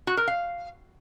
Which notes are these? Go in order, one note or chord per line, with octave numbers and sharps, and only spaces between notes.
F#4
A#4
F5